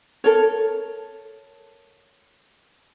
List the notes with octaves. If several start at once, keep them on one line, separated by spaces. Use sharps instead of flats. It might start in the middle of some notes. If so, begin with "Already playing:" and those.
A4 A#4 C#5